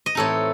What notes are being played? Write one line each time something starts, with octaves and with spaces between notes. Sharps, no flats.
D#5
A2 E3 C4 D#4 A4 C#5